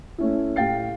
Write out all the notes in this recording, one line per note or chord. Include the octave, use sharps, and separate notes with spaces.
A3 C#4 E4
A2 G4 F5 G5 A6 C7